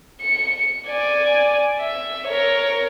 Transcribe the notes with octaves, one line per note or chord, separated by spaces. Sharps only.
C#7
D5 G#5
E5
A#4 C#5